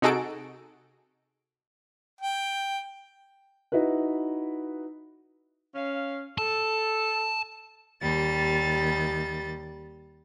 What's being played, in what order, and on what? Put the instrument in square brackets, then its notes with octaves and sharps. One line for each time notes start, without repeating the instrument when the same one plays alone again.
[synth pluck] C3 D#4 F#4 G#4 A4 D7
[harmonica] G5
[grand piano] D#4 E4 F#4 B4
[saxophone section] C#4 F5
[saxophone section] A4 [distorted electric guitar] A5
[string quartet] D#2 G3 A6